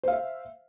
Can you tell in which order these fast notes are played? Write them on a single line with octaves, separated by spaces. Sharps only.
C5 F5 E5